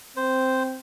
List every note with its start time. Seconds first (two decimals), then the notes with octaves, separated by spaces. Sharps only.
0.17 C4 C5